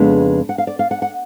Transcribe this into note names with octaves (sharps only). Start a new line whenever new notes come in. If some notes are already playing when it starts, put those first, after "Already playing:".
Already playing: F2 C#3 G#3 B3 D4 B4
F#5
F5
D5
F5
F#5
F#5